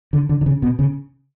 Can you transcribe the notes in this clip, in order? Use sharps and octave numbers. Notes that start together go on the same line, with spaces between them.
D3
D3
D3
C#3
B2
C#3